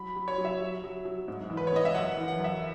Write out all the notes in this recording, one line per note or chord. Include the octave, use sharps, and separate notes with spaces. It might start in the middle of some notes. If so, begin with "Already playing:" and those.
Already playing: F#3 B5
F#3
C#5
F#3
E5
F#3
F#3
F#3
G#2
E3
B4
C#5
G#2 D#5
E5
F#2 F#5
F#5
E3
F#5
F#2
E5